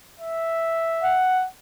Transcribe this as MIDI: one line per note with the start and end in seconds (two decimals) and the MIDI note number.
0.20 1.23 76
1.03 1.44 78